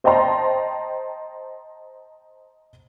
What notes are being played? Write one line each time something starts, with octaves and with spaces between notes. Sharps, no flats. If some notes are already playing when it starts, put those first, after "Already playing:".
C5 D#5 G5 A5 A#5 C6